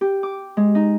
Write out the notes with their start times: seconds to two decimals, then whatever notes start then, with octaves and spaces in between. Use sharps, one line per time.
0.01 G4
0.23 D6
0.57 G#3
0.75 D#4